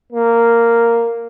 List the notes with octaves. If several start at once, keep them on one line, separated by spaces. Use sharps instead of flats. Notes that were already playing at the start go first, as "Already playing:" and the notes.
A#3